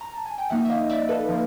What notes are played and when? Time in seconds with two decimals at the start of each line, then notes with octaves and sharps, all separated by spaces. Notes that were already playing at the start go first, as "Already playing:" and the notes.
0.01 A#5
0.14 A5
0.26 G#5
0.38 G5
0.50 F3 A#3 D#4 E5 F#5
0.65 E5
0.70 D#5 F5
0.89 D5 E5
1.09 A4 B4
1.29 F3 A#3